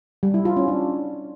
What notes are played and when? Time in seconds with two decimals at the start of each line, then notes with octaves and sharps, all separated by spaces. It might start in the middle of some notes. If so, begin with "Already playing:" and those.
0.23 G3
0.34 E4
0.45 F4
0.57 C#4
0.68 D4